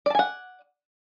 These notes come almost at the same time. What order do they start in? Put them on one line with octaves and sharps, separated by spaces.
D5 A5 G#5 F#5